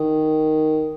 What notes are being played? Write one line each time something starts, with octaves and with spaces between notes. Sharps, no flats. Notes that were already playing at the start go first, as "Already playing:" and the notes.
Already playing: D#3